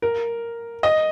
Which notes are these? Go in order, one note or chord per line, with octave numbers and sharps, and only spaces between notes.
A#4
D#5